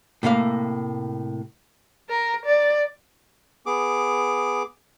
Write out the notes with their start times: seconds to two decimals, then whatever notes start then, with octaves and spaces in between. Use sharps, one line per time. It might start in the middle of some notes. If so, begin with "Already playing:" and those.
0.23 A2 C3 A#3 F5
2.09 A#4
2.46 D5
3.66 B3 G#4 D6